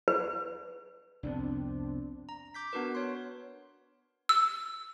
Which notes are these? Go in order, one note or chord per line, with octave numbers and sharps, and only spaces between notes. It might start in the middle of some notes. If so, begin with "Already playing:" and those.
B4
C2 F2 B3 C4 D4
A#5
D6 G6 B6
B3 D4 F#4 A#4 B4
C#5 C6
E6